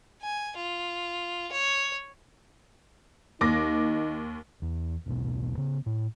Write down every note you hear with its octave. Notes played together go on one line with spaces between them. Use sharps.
G#5
F4
C#5
D#2 D#4 D6 A#6
E2
D#1 B1 B2
C#3 B3
A2